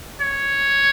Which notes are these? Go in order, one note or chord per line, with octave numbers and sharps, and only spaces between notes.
C#5